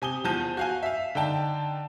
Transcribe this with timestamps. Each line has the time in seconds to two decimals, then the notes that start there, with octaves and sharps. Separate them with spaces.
0.02 C3 G#5 D#6 G7
0.24 E2 F3 A5 G6 D#7
0.57 F#4 F5 G#5
0.83 E5 F5
1.15 D3 D#4 G5 A5